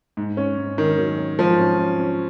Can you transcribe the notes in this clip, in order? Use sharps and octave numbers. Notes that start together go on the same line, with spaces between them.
G#2
C#4
G#2
D#3 C#4
F#3
C#4
G#2 F3
C#4
C#4
C#4